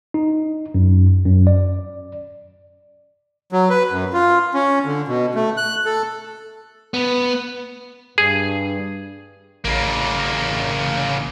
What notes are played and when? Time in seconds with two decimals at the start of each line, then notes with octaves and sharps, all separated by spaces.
0.14 D#4
0.75 F#2
1.25 F#2
1.47 D5
3.52 F#3
3.70 B4
3.91 F#2
4.13 F4
4.54 C#4
4.85 D3
5.08 B2
5.35 A3
5.57 F#6
5.85 A4
6.94 B3
8.18 G2 G#4
9.65 A1 C#3 A#3